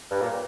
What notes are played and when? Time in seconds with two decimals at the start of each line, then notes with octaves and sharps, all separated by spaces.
0.11 G2
0.22 A#2